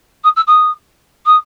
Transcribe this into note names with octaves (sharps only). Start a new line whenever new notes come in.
D#6
E6
D#6
D#6